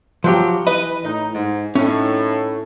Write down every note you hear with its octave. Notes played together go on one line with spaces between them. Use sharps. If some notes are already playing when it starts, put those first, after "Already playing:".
F3 F#3 G4
E3 B4 D#5
A2 D#4
G#2 D#4
A2 C#4 D#4